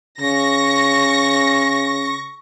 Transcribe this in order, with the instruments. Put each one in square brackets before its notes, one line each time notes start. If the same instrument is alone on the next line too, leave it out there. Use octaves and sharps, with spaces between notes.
[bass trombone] C#3 [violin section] C#6 A#6